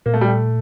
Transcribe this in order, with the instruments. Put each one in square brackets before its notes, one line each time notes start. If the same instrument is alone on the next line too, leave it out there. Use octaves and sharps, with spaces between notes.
[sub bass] A#2 [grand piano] A#3
[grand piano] A3
G3
A3